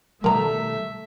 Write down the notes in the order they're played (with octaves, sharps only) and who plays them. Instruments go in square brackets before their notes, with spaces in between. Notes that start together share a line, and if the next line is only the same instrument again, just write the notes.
[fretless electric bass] B2 D#3 G3 [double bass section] A3 [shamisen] A#4 A#5 [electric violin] E5